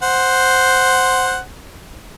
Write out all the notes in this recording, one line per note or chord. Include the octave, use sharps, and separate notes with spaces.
C5 F#5